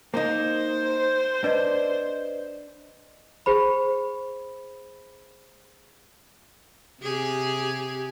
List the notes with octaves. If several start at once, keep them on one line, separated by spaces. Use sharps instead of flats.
A#3 D#4 C5
D4 B4 D5 D#5
G#4 C5 B5
C3 G4 G#4